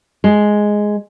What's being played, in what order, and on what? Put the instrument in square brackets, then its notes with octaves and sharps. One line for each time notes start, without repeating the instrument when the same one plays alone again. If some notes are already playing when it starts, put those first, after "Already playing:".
[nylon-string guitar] G#3